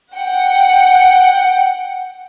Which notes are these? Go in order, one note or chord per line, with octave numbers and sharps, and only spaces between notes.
F#5 G5